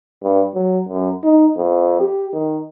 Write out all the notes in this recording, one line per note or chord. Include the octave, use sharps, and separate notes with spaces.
G2
F#3
F#2
D#4
F2
G4
D#3